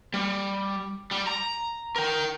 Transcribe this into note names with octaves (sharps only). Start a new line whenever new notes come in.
G3
G3
A#5
A#4 G5